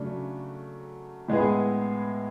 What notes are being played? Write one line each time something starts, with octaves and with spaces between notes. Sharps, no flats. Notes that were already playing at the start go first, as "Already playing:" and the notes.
Already playing: C#3 F#3 A3 D4
A2 G#3 B3 E4 G#4